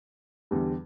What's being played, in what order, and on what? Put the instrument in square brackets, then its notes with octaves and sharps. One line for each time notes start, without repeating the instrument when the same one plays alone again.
[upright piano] E2 D3 G3